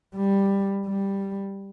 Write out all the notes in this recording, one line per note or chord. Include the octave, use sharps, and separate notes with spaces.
G3
G3